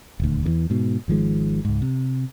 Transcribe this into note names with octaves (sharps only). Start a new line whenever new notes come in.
D#1 D2
E2 D3 E3
G#2 B2
G#1 D#3 F3 G#3
C#2 G#2
C3